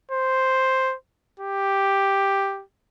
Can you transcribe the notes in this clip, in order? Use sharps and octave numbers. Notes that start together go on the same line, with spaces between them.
C5
G4